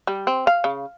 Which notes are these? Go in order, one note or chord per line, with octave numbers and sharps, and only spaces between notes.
G3
C4
F5
C#3